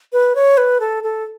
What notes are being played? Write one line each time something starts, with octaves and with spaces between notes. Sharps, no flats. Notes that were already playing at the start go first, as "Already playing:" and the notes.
B4
C#5
B4
A4
A4